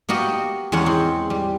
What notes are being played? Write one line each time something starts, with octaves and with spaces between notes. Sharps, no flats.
A#3 B3 F#4 G4 D#5
E2 G#3 C#4 F#5
C4
G3